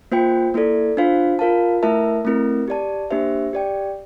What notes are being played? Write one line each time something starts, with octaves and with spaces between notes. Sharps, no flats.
A#3 F4 C5 G5
A#3 E4 A4 D5
D4 F4 C5 F5
F4 A#4 F5 A5
A3 E4 A#4 E5 A5
A3 C4 E4 A#4
G4 D5 A5
A#3 D4 G4 C5 E5
G4 D5 G5